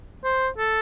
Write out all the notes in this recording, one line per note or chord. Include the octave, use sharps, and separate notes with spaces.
C5
A4